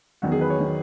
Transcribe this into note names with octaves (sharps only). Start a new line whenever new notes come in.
E2 D#3 F#3 F#4
G#4
B4
C#5
D#3 F#3